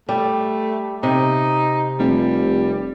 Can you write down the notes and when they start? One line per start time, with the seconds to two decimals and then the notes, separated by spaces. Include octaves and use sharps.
0.09 G3 A3
1.03 C3 D#4
1.99 F1 G3